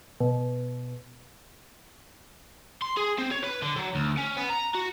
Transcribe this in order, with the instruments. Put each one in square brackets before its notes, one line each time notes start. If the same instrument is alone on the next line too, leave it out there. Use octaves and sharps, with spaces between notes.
[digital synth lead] B2
[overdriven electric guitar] C6
G#4
C4
C#5
B4
D3
F#3
D2
C#4
B3
A#5
F#4